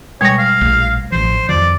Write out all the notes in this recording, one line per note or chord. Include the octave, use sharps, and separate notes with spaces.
B2 G3 G#3 C#5 G#6 A#6
F5
A#1 A3
A1 F3 C5
F2 D#3 F3 D5